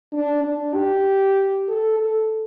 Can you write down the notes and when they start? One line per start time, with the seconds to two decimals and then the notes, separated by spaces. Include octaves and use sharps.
0.13 D4
0.44 D4
0.74 G4
1.69 A4
2.00 A4